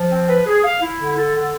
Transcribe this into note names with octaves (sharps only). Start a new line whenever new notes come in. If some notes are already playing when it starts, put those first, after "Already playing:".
Already playing: F3
C4
B4
G#4
F5
E4
D3
A4
D3